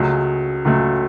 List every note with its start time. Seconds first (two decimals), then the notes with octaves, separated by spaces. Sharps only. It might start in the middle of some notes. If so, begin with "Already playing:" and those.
Already playing: C#2 C#3 F#3 A3
0.65 C#2 C#3 F#3 A3